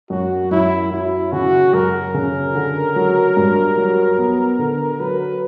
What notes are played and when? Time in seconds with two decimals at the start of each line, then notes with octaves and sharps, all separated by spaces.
0.10 F#2 F#4
0.51 F#2 E4
0.92 F#3 E4
1.32 C#3 F#4
1.73 F#2 A#4
2.14 C#3
2.55 D3
2.96 F#3
3.37 G2
3.78 F#3
4.18 B3
4.59 D3
5.00 F#3 B4